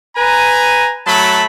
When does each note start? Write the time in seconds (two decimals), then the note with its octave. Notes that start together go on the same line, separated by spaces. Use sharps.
0.17 B4 G#5 A#5
1.06 F#3 A3 A5 B5